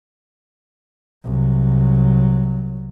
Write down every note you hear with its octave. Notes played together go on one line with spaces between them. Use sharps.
C2 F#3